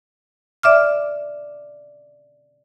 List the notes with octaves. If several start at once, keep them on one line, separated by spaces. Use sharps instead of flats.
D5 E5 D6 F6